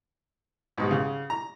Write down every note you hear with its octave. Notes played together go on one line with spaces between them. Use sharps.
B1 G#2 G3
C#3
A#5